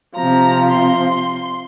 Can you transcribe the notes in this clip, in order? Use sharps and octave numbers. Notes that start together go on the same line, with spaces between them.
C3 F3 A#5
C6